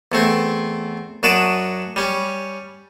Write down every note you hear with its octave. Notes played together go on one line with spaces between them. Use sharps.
E2 A3 C4
F#2 D4 F#4 D5 A5 D#6
G3 C#4